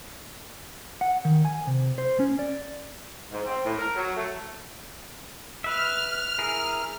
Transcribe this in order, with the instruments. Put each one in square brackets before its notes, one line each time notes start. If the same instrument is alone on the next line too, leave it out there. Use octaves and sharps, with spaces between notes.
[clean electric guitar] F#5
D#3
G#5
C3
C5
C#4
D5
[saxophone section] G#2
C4
A2
A#4
F#3
A3
[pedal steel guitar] B4 E5 [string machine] F6
[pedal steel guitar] E4 G#4 A#4